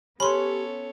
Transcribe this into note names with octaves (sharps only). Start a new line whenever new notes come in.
B3 C#4 G4 A4 B4 C#5 B5 C6